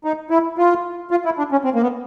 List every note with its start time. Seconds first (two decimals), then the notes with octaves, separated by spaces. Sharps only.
0.04 D#4
0.30 E4
0.58 F4
1.11 F4
1.25 E4
1.38 D4
1.52 C#4
1.64 C4
1.75 A#3
1.83 B3